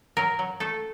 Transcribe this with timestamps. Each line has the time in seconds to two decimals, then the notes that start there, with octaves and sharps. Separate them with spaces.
0.17 F#3 A#4
0.39 F#3
0.60 A3 A4